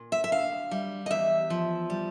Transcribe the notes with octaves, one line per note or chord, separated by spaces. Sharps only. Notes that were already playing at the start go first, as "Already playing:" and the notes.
Already playing: A#2
E5
E5
D2 F5
G3
D#5
E2 E5
F3
G3